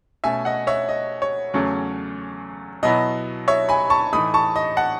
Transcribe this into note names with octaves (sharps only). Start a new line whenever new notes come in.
B2 A3 C#4 E5 G#5
D#5 F#5
C#5 E5
D#5
C#5
E2 C#3 F#3 A3 C#4
B2 F#3 B3 E4 D#5
C#5 E5
G#5 B5
A5 C#6
A2 E3 A3 D#4 B5 D#6
A5 C#6
D#5
F#5 A5